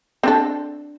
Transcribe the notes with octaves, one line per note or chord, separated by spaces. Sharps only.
C4 D4 A4